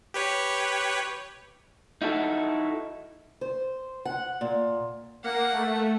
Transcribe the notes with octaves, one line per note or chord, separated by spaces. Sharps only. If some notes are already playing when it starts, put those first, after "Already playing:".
G4 B4 C#5
D#4 E4 F#4 A4
C5
F#5
A#2
A#3 F#5
A3